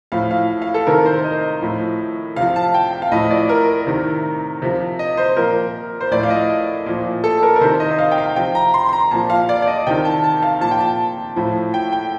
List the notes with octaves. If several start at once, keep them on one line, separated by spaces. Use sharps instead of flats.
A2 F3 F5
F5
F5
A4
C3 D#3 A#4
C5
D#5
A2 F3
C3 F3 F5
A5
G5
G5
F5
A2 F3 D#5
D5
A#4
C3 D#3
C3 F3
D#5
C5
A#2 F3 A#4
C5
A2 F3 D5
F5
D#5
A#2 F3
A4
A#4
A#4
C3 D#3 C5
D#5
D#5
F5
G5
F5
C3 F3 G5
A#5
C6
C6
A#5
A#2 F3 A5
F5
D5
D5
D#5
C3 D#3 G5
A5
A5
F5
A#2 F3 A5
G5
A5
A2 F3
G5
G5